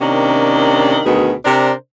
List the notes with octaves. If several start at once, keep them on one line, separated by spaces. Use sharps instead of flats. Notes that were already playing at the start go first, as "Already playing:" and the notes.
C3 D#3 A#3 C#4 D4
D2 B2 D#3 B3 G#4
C3 D4 A#4 C5 D5